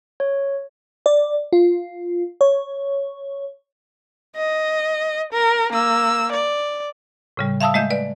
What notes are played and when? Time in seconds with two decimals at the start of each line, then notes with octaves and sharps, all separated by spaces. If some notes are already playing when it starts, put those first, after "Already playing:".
0.20 C#5
1.06 D5
1.53 F4
2.41 C#5
4.36 D#5
5.33 A#4
5.73 A#3 E6
6.32 D5
7.37 A2 C#3 G3
7.61 E5 F5 A5 D#6 E6
7.74 G#3 A3 D#5 E5 G6
7.90 B4 D5